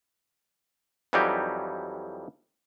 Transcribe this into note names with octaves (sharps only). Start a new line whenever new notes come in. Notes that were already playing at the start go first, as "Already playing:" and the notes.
F2 E3 F#3 G3 D#4 G4